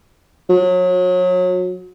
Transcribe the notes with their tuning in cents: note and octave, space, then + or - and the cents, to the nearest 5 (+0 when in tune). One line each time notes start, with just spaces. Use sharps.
F#3 -30